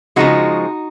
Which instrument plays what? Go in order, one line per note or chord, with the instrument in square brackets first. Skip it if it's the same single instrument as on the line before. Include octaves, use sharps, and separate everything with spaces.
[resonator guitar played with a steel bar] C#3 F3 G#3 D#4 F#4